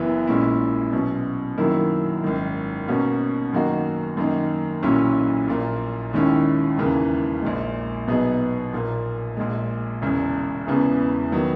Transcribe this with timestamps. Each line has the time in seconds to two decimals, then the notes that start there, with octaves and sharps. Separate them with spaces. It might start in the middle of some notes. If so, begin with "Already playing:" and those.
Already playing: F#1 F#2 E3 B3 E4
0.27 A#1 A#2 G#3 C#4 E4
0.92 B2 F#3 C#4
1.58 F#2 D#3 F#3 A#3 E4
2.23 G#1 F#2 D#3
2.88 B2 A#3 C#4 F#4
3.53 F#2 D#3 A#3 D#4 F#4
4.17 F#2 D#3 A#3 D#4
4.83 B1 A#2 F#3 C#4 E4
5.48 A#1 A#2 A#3
6.13 D#2 D#3 G#3 C#4 E4
6.77 E1 D#2 C#3 E3 A#3
7.42 A#1 A#2 G#3
8.07 B2 F#3 B3 D#4 G#4
8.73 A#1 A#2 A#3
9.37 A#1 A#2 G#3
10.02 E1 E2 C#3
10.67 E1 E2 C#3 E3 B3
11.32 D#3 F#3 B3